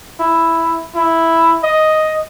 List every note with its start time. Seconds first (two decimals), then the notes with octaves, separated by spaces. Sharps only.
0.20 E4
0.95 E4
1.63 D#5